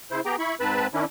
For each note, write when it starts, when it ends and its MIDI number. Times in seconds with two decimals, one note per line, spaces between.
0.11 0.21 49
0.11 0.21 64
0.11 0.21 72
0.25 0.36 59
0.25 0.36 67
0.25 0.36 68
0.25 0.36 79
0.25 0.36 82
0.39 0.55 64
0.39 0.55 83
0.39 0.55 85
0.60 0.87 44
0.60 0.87 60
0.60 0.87 71
0.60 0.87 81
0.60 0.87 83
0.94 1.05 51
0.94 1.05 61
0.94 1.05 62
0.94 1.05 64